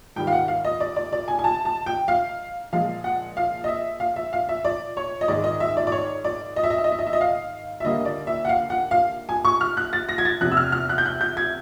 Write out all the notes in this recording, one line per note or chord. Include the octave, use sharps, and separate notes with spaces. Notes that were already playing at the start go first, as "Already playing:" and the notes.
G#2 D#3 G3 G5
F5
F#5
F5
D#5
D5
D5
D5
G#5
G#5
A5
A5
G5
F5
A#2 F3 G#3 F5
F#5
F5
D#5
E5
F5
E5
F5
E5
D5
C#5
D#5
G#2 D#3 G#3 D5
D#5
E5
D5
D5
C#5
D5
D#5
E5
D#5
E5
D#5
E5
D#5
E5
D#5
F5
E5
D#2 D3 G3 A#3 D#5
D5
E5
F#5
F5
F#5
F5
G#5
C#6
F6
F#6
A6
A#6
G#6
A6
E2 C3 F3 F#6
E6
F6
F6
F#6
G6
F#6
G6
G#6